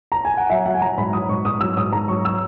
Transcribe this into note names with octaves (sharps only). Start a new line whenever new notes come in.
A#5
G#5
F#5
F#3 E5
F#3 F#5
G#5
F#3 A#5
G#2 B5
F#3 D#6
G#2 C#6
G#2 D#6
F#3 E6
G#2 D#6
G#2 A#5
F#3 C#6
E6